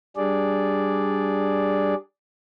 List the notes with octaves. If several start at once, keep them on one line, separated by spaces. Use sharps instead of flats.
G3 D4 G#4 D5